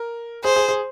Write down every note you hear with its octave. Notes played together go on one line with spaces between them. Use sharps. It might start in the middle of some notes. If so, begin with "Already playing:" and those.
Already playing: A#4
G#4 C5
G#4
G#4